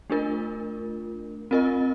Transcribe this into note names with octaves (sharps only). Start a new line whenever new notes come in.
A3 D4 F4 A#4
C4 F4 A#4 D#5